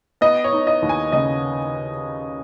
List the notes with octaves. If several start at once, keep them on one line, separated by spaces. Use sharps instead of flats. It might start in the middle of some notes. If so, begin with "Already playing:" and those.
B3 D#5
C#5
D#4
D#5
D#2
G#5
C#3 D#5